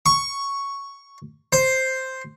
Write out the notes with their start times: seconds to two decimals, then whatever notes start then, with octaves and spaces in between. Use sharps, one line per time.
0.06 C#6
1.53 C5